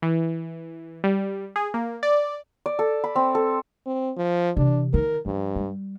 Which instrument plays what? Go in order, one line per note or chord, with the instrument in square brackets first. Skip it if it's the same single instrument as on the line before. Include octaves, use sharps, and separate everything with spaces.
[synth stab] E3
G3
G#4
A#3
D5
[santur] D5
A4
B5
C4
A4
[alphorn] C4
F3
[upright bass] C3 E3 [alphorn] D4
[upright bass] D#3 D#4 [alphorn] A#4
[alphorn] G2 [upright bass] F3
[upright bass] G3